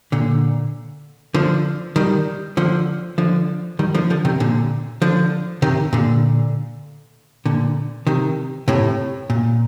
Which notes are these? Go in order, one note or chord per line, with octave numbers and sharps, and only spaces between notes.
A#2 D3
D3 F3
D#3 G3
D3 F3
D3 F3
D#3 G3
D3 F3
D3 F3
C3 D#3
A#2 D3
D3 F3
C3 D#3
A#2 D3
A#2 D3
C3 D#3
A2 C3
A#2